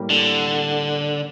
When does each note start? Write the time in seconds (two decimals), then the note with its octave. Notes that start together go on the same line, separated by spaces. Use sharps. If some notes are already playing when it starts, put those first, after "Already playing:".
Already playing: A2 G3 A#3 A#4
0.10 D3